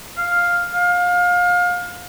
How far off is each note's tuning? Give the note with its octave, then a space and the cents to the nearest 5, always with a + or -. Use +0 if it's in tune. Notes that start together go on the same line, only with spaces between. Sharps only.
F5 +5
F5 +30